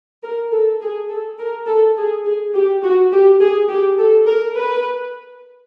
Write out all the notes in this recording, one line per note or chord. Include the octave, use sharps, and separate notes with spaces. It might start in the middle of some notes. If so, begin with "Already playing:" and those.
A#4
A4
G#4
A4
A#4
A4
G#4
G#4
G4
F#4
G4
G#4
G4
A4
A#4
B4